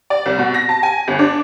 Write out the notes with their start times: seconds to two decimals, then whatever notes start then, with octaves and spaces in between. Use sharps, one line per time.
0.10 D5
0.26 C2
0.39 B2
0.54 A#6
0.69 A5
0.83 G#5
1.08 G1
1.19 D4